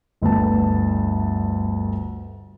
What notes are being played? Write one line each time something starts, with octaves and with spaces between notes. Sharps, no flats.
G1 D2 A3 B3 A5